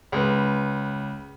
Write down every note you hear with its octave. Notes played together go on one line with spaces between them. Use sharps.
C#2 B4